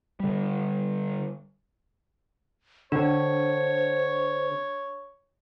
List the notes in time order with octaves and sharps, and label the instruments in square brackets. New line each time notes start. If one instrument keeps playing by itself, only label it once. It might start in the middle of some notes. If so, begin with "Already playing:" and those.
[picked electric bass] D3 G3
[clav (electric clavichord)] D3 [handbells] D4 [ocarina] C5 [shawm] C#5